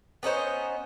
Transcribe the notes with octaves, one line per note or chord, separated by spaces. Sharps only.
B3 C#4 D#4 C5